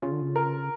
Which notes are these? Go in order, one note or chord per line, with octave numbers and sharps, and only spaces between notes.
C#3 F4
D3
C#3
A#4